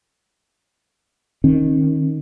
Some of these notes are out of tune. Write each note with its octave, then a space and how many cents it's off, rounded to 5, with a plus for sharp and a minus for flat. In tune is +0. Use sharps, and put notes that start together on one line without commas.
D#3 +0 C#4 -45